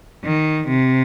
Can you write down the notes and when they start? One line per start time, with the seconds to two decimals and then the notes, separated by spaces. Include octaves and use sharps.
0.24 D#3
0.68 C3